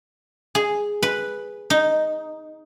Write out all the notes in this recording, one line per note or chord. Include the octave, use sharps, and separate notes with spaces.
G#4
B4
D#4